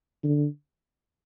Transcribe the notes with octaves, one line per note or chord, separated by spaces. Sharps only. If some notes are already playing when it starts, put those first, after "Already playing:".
D3